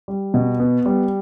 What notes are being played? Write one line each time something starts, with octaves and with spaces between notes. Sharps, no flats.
G3
B2
B3
G3